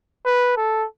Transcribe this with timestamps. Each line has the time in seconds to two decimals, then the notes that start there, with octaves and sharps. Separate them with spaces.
0.25 B4
0.57 A4